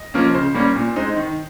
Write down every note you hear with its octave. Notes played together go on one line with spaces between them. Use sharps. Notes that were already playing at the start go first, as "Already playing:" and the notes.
Already playing: D#5
F3 A#3 C#4
C#3 C5
G3 A#3 C#4
A#2
G#3 C4 D#4
D#3